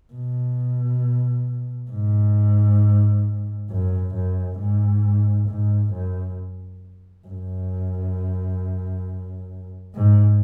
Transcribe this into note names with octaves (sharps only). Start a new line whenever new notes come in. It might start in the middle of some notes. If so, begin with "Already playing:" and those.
B2
G#2
F#2
F#2
G#2
G#2
F#2
F#2
G#2